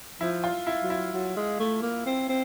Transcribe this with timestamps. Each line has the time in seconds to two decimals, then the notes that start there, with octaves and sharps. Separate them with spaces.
0.21 F3 E4
0.44 F4
0.67 E4
0.83 F#3
0.90 E4
1.13 F#3
1.37 G#3
1.60 A3
1.82 A#3
2.06 C4
2.29 C4